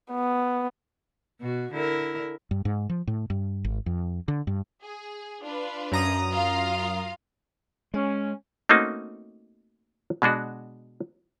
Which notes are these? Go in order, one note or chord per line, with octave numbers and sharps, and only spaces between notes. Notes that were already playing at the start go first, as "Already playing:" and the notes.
B3
B2 F#4
D3 E4 A#4
G2
G#2
F3
A2
G2
G#1
F2
D3
G2
G#4
D4 F4 B4
F#2 A#5 D#6
F4 F5
G#3 C#4
A3 A#3 C4 C#4 D#4 F#4
B2 G#3 D4 F#4